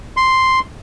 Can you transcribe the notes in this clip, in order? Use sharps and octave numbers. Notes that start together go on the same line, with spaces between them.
C6